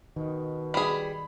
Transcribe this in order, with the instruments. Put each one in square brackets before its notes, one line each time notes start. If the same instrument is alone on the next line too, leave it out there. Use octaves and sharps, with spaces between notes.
[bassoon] B2 [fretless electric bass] D#3
[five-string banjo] G3 G#4 [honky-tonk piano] B5